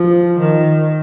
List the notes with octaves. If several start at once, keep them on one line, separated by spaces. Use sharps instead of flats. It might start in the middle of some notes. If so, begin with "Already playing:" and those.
Already playing: F3
D#3